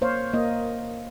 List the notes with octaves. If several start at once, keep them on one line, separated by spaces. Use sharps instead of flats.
A#3 C5 C#5 F5
A#3 D#5